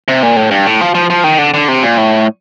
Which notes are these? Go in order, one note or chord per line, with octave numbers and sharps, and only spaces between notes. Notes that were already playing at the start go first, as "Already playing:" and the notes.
C3
A#2
A2
G2
A2
F3
F3
F3
D#3
D3
D3
C3
A#2
A2